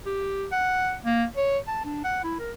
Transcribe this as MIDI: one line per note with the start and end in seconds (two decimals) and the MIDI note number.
0.06 0.46 67
0.52 0.95 78
1.05 1.25 58
1.37 1.59 73
1.68 1.82 81
1.85 2.01 62
2.04 2.19 78
2.23 2.35 64
2.39 2.52 70